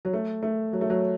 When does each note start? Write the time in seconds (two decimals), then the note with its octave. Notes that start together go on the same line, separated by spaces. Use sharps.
0.05 F#3
0.14 A3
0.43 A3
0.73 F#3
0.81 A3
0.90 F#3